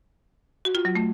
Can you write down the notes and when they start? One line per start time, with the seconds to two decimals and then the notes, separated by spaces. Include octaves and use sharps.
0.65 F#4
0.75 F4
0.85 F#3
0.95 A3